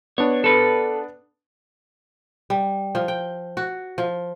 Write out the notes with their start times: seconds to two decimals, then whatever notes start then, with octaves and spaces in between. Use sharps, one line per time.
0.18 B3 D4 C#5
0.44 A4 B4
2.50 G3
2.95 F3
3.08 G5
3.57 F#4
3.98 F3